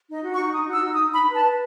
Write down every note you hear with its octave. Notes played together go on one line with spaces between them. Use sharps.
D#4 D#5
F#4
C#6
D#4
D#4 D#6
F#4
E6
D#4
D#6
D#4
D#4 B5
B4
A5
B4